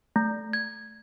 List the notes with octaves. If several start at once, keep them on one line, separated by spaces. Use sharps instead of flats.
A3
G#6